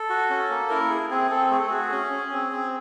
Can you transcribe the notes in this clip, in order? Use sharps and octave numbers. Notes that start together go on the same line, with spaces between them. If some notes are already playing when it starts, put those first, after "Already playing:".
Already playing: A4
F#4
C#4
A#3
E4 A#4
G#4
C4 G#4
C4 A4
A3 G#4
A4
F#4 G#4
C#4
C#4
C4
C4